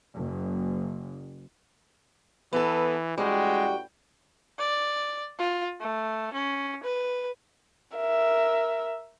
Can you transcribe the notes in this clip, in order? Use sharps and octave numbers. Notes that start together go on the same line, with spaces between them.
F#1
E3 B3 A4
A1 G3 G#3 F#4 G5
D5
F4
A3
C#4
B4
A#4 E5